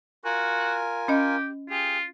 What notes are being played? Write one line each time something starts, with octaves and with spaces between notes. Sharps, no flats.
F4 F#4 A#4 G#5
C#4 G4 D#5
F4 G4 G#4